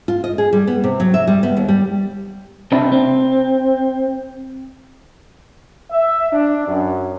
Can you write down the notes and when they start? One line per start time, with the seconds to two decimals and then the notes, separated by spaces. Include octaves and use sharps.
0.08 F4
0.24 D#5
0.38 G#4
0.53 G3
0.67 B3
0.84 C3
1.00 F#3
1.14 E5
1.27 G3
1.43 B3
1.57 D#2
1.68 G3
2.72 C3 C4 D4 E4
2.92 C4
5.91 E5
6.33 D4
6.68 F#2